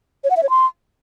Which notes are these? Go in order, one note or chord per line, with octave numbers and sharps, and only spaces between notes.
C#5
F#5
E5
C#5
C6